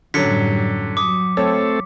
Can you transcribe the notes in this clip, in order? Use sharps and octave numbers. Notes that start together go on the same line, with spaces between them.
F#2 A2 D3 F#3 G3 C#4 B6 C#7
F#3 D6 D#6
A3 C4 A4 C#5